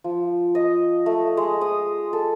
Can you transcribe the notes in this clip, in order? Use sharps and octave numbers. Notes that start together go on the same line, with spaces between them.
F3
D#5
A3
G#3
D#6
A4